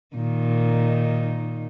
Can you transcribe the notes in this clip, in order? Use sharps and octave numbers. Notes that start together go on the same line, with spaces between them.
A#2 D#3 D#4